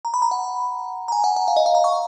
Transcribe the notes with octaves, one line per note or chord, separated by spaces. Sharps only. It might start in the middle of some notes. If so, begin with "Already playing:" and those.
A#5
B5
A#5
F#5
A#5
G#5
F#5
F#5
F5
D#5
F5
A#5
C#6